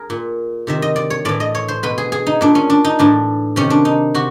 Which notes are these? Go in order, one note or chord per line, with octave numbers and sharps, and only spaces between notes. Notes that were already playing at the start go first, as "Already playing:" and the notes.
Already playing: G#4 A#4
A#2
C3 D#3 E5
D#5
D5
C#5
A2 E3 D5
D#5
C#5
C5
B2 B4
G#4
G#4
D#4
A#2 D4
C#4
D4
D#4
A2 E3 D4
C3 D#3 C#4
D4
D#4
C3 F#4